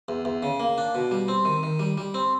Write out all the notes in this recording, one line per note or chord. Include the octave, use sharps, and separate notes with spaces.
E2
E2
C#3
A#3
D4
B2
G3
C4
D#3
D#3
G3
G3
C4